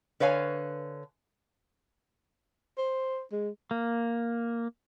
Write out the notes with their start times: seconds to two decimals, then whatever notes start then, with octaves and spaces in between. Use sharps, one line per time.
0.20 D3 B4 C#5 F5 G#5
2.78 C5
3.32 G#3
3.71 A#3